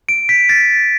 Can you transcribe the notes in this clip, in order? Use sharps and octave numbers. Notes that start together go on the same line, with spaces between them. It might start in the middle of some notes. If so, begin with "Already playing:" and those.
D7
B6
A6